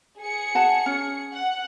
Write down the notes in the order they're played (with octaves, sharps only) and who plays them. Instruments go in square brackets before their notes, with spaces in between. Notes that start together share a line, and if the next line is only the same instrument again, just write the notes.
[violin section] G#4 C#7
[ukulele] F#4 F#5 A5
C#4
[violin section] F#5